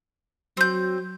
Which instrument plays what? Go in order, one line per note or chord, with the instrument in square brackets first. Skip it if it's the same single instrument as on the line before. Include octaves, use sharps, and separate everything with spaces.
[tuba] F#3 [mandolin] C4 G6